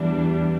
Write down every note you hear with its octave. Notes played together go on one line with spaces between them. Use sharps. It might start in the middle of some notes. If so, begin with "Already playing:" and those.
Already playing: E2 E3 G3 D4